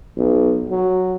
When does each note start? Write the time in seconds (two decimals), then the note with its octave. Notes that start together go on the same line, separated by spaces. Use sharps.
0.16 B1
0.70 F#3